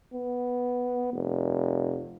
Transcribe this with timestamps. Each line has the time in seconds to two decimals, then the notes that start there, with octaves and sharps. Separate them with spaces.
0.14 B3
1.12 F1